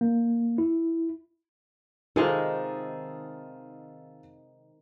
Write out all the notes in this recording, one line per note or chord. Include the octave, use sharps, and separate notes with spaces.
A#3
E4
C3 D#3 G#3 D#4 F4 G#4 A4